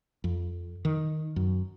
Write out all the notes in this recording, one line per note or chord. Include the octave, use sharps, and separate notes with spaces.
F2
D#3
F#2